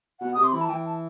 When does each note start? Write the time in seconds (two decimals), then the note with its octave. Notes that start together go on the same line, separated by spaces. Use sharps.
0.20 B2 F#5
0.34 C3 D#6
0.44 C6
0.52 E3 B5
0.61 A5
0.69 E3 G5
0.86 A5